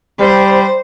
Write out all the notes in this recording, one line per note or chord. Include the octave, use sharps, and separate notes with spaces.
G3 C5